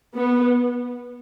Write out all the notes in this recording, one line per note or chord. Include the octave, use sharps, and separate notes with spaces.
B3